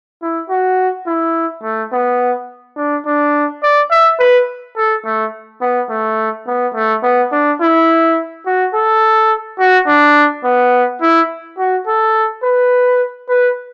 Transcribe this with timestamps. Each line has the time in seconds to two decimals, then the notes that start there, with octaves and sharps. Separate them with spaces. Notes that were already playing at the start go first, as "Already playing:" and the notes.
0.22 E4
0.49 F#4
1.06 E4
1.63 A3
1.92 B3
2.77 D4
3.06 D4
3.63 D5
3.91 E5
4.20 B4
4.76 A4
5.05 A3
5.61 B3
5.90 A3
6.47 B3
6.74 A3
7.03 B3
7.32 D4
7.61 E4
8.46 F#4
8.74 A4
9.58 F#4
9.87 D4
10.44 B3
11.01 E4
11.58 F#4
11.87 A4
12.43 B4
13.29 B4